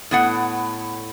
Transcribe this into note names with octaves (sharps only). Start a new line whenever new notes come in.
A2 B3 F#5